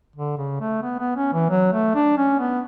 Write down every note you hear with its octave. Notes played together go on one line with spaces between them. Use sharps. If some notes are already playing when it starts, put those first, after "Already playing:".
D3
C#3
A3
B3
B3
C#4
E3
F#3
A3
D4
C#4
B3